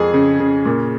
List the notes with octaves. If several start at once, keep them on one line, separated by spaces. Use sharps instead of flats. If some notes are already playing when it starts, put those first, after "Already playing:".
Already playing: F2 G#4
C#3
C#3
A#2